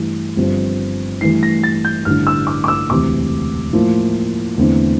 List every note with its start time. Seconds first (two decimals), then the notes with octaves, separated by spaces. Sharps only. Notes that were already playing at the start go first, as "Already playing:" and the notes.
Already playing: G2 E3 A3 E4
0.37 G1 G2 F3 C4
1.21 G2 E3 A3 E4 C7
1.43 A#6
1.63 A6
1.85 G6
2.05 A1 G2 D3 A3 E4 F6
2.27 E6
2.47 D6
2.64 D6
2.68 E6
2.90 E1 D2 C3 E3 D6
3.73 A2 F3 A#3 E4
4.58 E2 D3 A3 C4 E4